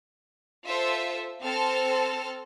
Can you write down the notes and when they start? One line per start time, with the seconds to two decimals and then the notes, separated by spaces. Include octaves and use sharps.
0.66 F4 A4 C5 E5
1.42 C4 A4 C5 A5 F6